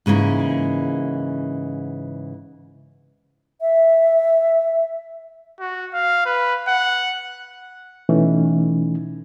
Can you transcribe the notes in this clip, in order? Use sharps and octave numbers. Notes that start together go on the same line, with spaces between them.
G#2 C#3 E3 A#3
E5
F#4
F5
B4
F#5
B2 E3 A3 C#4 D#4